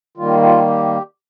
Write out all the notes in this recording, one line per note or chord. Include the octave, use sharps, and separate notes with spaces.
D#3 G3 A#3 F4
F4
G4